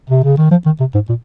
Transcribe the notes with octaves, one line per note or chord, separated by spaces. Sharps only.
C3
C#3
D#3
F3
D#3
C3
G#2
A#2